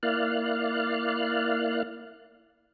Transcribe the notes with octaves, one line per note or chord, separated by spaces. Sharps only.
A#3 E4 D5 F5 F6 F#6